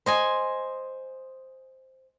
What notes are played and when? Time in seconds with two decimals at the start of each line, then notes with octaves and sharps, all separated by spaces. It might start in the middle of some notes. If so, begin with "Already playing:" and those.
0.06 C5 D#5 G#5